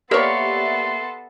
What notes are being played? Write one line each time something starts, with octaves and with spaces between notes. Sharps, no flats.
A#3 B3 G4 A4 C#5 D5 E5 C6